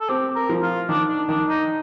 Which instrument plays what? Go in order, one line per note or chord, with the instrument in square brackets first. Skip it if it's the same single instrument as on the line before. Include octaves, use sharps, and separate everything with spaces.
[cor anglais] A4
[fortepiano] C4 [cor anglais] G4
[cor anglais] A#4
[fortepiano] F3
[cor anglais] F4
[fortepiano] D#3 [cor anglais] D4
[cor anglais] D4
[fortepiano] D#3 [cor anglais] D4
[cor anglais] D#4